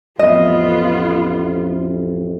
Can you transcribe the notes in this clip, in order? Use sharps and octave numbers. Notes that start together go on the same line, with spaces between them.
A1 F2 B3 F4 D#5